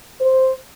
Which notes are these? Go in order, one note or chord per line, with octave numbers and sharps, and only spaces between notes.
C5